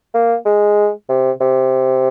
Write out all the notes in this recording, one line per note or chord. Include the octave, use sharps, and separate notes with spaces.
A#3
G#3
C3
C3